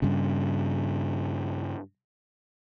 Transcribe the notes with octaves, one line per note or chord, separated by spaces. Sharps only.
G2 C#3